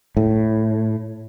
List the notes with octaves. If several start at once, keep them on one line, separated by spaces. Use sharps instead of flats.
A2